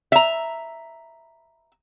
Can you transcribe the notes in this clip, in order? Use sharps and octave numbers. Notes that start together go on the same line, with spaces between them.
E5 A#5